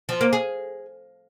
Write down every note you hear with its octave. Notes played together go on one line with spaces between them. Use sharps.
F3
A#3
G#4